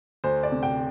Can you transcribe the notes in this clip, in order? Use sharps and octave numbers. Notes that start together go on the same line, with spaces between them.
D2 C5
D5
C3
G5